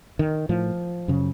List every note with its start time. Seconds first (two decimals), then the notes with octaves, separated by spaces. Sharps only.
0.19 D#3
0.49 A2 F3
1.08 F#2 C#3